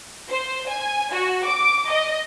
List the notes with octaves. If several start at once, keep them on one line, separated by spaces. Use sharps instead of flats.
C5
G#5
F#4
D6
D#5